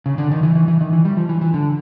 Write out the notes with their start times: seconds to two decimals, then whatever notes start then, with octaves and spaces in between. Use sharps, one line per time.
0.06 C#3
0.18 D3
0.32 D#3
0.43 E3
0.55 E3
0.68 E3
0.81 D#3
0.93 E3
1.05 G3
1.17 F3
1.29 E3
1.41 E3
1.54 D3